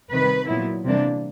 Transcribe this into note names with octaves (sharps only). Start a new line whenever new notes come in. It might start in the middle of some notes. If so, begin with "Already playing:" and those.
C3 D#3 G3 B4
A#2 F#3 B3 E4
C3 E3 G3 A#3 D4